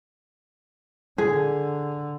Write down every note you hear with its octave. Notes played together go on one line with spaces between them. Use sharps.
D3 G#4